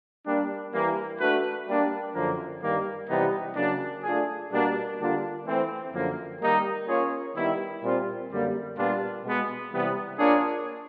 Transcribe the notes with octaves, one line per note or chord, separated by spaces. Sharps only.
G3 A#3 D4
E3 G3 A#3
A3 D4 F#4 B4
G3 A#3 D4
F#2 D3 F3 A#3
G2 D#3 G3 A#3
C3 E3 G3 B3 D#4
C#3 F#3 A#3 D4
A3 D4 F4 G#4
B2 G3 A#3 D4 F#4
D3 G3 A#3 D4 F4
E3 A3 C4
F#2 D3 F3 A#3
D#3 G3 A#3 D#4
A#3 C#4 F4 G#4 C#5
D#3 G3 B3 E4
A#2 G3 C4 F4
F#2 D3 G3 A#3
A#2 G3 B3 D4 F4
B2 G#3 B3
C3 E3 G3 B3
A#3 D4 F4 G#4 C#5